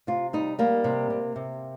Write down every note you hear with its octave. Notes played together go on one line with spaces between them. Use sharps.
C3 F4
G3 D#4
G3 A#3
C3
C3
C3